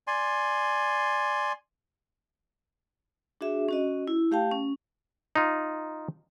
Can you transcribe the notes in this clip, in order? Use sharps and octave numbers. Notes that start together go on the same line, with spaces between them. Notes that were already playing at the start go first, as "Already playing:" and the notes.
D5 G#5 C6
D4 F#4 G#4 E5
C#4 F#4 D#5
E4
A3 G4 F5 G5 A5
C#4
D#4 F4